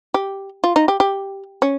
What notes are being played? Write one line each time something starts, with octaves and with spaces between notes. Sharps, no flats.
G4
F4
D#4
G4
G4
C#4